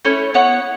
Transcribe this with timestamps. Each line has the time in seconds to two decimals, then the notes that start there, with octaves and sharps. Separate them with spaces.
0.05 A3 C#4 E4 C#5
0.34 B3 E4 C#5 F#5